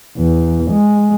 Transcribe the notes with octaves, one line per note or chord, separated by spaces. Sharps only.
E2
G#3